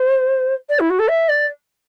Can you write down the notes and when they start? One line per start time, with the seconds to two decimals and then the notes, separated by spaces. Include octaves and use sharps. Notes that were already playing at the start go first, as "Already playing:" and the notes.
Already playing: C5
0.69 D5
0.79 E4
0.89 F#4
0.99 A4
1.08 E5
1.28 D5